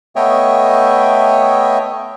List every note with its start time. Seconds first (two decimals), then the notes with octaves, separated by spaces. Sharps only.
0.16 A3 B3 C#5 D#5 E5 G5